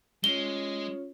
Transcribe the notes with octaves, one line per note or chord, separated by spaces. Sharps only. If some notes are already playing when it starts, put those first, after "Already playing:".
G#3 C#4 F4 C#5 G7